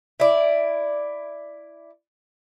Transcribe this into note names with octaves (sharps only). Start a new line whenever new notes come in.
E4 D5